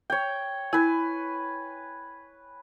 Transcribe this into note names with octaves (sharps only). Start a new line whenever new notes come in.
C#5 G5
E4 B4 G#5